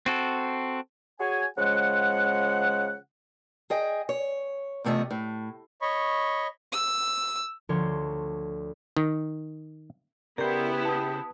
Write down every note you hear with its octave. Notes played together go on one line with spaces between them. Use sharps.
C4 F#4 A4
F#4 G#4 C#5 G#5
C#3 F3 G#3 F#5
G#4 D#5 G5
C#5
E2 C3 A3 F4 D#5
A2
C#5 D#5 B5 C#6
E6
D2 D3 F3 C#5 C6
D#3
C#3 B3 E4 G4 A#4 C5 D5 G5
A5 D#6